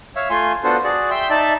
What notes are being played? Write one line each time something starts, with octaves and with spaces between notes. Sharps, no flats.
C#5 E5 F5
A3 F4 G#5 C6
B3 D4 F4 F#4 A4 C5
F#4 G#4 D5
E5 G5 C6 G6
D#4 D5 E5 A5